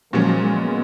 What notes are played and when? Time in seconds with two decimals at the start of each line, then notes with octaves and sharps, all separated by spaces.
0.13 A#2 F3 F#3 G#3 C#4
0.42 G#3 B3